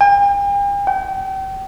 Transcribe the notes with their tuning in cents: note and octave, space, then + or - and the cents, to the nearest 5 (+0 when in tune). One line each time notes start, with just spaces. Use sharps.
G5 +45
G5 -35